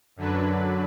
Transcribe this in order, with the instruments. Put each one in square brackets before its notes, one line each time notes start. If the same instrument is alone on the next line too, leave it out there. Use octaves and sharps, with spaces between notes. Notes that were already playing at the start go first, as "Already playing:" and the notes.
[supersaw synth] F#2 D3 F#3 D4 B4